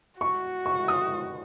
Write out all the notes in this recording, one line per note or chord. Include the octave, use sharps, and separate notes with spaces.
F#4 C#6
C#6
D#6